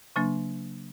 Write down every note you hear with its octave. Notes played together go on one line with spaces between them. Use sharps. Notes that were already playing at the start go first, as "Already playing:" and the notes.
C#3 F#3 A#3 D4